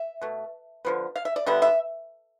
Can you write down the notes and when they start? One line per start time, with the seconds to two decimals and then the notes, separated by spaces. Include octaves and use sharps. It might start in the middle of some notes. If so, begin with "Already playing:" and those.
Already playing: E5
0.21 B2 A3
0.85 D3 F3 B3
1.16 F5
1.25 E5
1.36 D5
1.46 D3 G3 B3 E5
1.62 E5